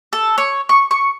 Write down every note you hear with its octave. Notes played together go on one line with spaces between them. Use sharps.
A4
C#5
C#6
C#6